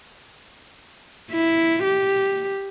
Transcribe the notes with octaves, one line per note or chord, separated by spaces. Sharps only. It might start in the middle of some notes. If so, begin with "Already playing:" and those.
E4
G4